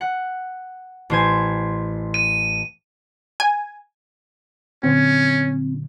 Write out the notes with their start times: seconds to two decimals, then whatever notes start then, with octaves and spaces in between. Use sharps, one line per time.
0.01 F#5
1.10 A1 C5 G#5
2.14 D#7
3.40 G#5
4.83 A#2 D3 F#3 C4 C#4